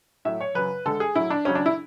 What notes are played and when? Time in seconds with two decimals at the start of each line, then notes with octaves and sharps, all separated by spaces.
0.25 A2 F#3 E5
0.40 C#5
0.55 F#2 C#3 F#3 B4
0.85 D2 D3 G#3 A4
1.00 G#4
1.15 A2 F#3 E4
1.30 D4
1.45 C#2 C#3 F#3 C#4
1.55 D4
1.66 E4